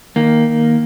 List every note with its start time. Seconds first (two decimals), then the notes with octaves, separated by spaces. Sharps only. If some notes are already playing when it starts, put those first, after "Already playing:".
0.16 D#3 A#3